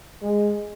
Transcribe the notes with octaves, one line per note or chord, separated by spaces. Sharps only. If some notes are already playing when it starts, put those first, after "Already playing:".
G#3